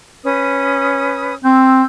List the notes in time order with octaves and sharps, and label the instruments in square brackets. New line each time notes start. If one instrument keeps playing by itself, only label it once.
[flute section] C#4 B4 D#6
[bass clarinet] C4 [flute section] E6 G6